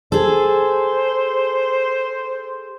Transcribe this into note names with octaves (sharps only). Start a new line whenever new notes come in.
G#4 A4 C5